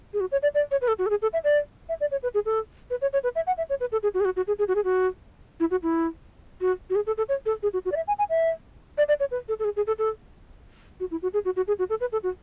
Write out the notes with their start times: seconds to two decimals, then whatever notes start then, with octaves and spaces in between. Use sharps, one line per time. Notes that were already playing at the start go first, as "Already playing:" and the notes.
0.14 G#4
0.20 F#4
0.32 C#5
0.43 D5
0.54 D5
0.71 C#5
0.81 B4
0.88 A4
0.99 F#4
1.06 A4
1.10 G#4
1.22 A4
1.33 E5
1.44 D5
1.89 E5
2.00 D5
2.11 C#5
2.23 B4
2.34 G#4
2.46 A4
2.90 B4
3.02 C#5
3.13 C#5
3.23 B4
3.36 E5
3.47 F#5
3.58 E5
3.70 C#5
3.80 B4
3.92 A4
4.03 G#4
4.14 F#4
4.20 G#4
4.25 F#4
4.36 F#4
4.47 G#4
4.59 G#4
4.68 F#4
4.75 G#4
4.84 F#4
5.60 E4
5.71 F#4
5.83 E4
6.61 F#4
6.90 F#4
6.95 G#4
7.07 A4
7.18 A4
7.29 C#5
7.46 A4
7.63 G#4
7.73 F#4
7.85 F#4
7.92 D5
7.96 E5
8.08 G#5
8.19 G#5
8.30 E5
8.98 D5
9.08 D5
9.20 C#5
9.31 B4
9.48 A4
9.59 A4
9.64 G#4
9.76 G#4
9.87 A4
9.99 A4
11.00 F#4
11.11 E4
11.22 F#4
11.34 G#4
11.45 F#4
11.56 F#4
11.67 G#4
11.79 F#4
11.90 A4
12.01 B4
12.12 A4
12.23 F#4